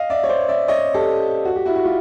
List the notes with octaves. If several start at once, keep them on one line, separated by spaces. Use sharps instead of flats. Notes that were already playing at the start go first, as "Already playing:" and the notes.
Already playing: D#5 F5
D5 E5
C#5
C5 D5
D5 E5
C#5 D#5
G4 A4
F#4
G4
E4 F#4
F#4
F4 G4